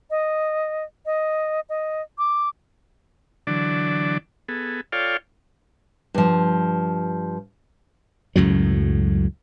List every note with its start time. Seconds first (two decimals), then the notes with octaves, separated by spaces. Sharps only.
0.10 D#5
1.06 D#5
1.69 D#5
2.18 D6
3.47 D3 E3 F#3 D4 D5
4.49 B3 G#4 A4
4.92 F4 A4 C#5 D5 F5 G5
6.14 G2 F3
8.36 C#2 F#2 A2 F#3